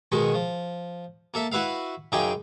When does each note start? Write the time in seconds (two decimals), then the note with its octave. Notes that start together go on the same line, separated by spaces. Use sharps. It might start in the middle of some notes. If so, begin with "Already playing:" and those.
0.12 B2 D#3 G#3 C#6
0.34 F3
1.34 A#3 A4 E5
1.52 E4 F#4 B4 E5 F5
2.12 F#2 C#3 D#4 G#4 G5 D6